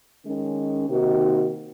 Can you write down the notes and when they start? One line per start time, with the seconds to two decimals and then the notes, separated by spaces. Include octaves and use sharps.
0.25 D#3 G#3 C#4
0.88 C3 D#3 A#3 D#4 F#4